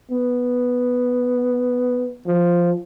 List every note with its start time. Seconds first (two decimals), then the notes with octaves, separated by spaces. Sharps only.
0.11 B3
2.27 F3